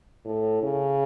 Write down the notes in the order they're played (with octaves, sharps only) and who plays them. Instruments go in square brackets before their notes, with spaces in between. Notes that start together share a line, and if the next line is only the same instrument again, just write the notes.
[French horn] A2
C#3